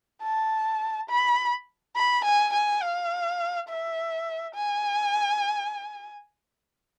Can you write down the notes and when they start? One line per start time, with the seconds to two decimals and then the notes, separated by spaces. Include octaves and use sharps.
0.22 A5
1.09 B5
1.96 B5
2.25 G#5
2.53 G#5
2.82 F5
3.69 E5
4.54 G#5